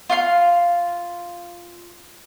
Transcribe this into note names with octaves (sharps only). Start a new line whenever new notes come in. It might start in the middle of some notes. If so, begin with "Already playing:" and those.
F4 F5 C6